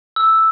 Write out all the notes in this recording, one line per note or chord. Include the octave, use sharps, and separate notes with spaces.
E6